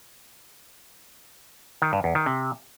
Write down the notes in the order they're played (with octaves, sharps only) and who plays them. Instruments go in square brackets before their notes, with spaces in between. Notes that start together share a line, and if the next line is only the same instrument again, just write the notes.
[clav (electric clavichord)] D#3
G2
E2
D#3
C3